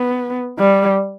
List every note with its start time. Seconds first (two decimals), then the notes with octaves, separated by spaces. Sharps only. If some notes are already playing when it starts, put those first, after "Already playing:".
Already playing: B3
0.59 G3